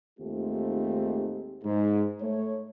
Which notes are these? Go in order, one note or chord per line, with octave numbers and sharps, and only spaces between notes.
D#2 G#2 A3 C4 F4 G4
G#2
A3 C#5